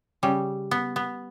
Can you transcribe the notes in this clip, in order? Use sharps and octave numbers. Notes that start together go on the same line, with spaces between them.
C#3 G3
B3
B3